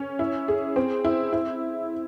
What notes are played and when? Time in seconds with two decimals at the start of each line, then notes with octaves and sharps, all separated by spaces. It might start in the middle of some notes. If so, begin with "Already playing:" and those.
Already playing: C#4
0.19 E4
0.48 G#4
0.76 C4
1.05 E4
1.33 E4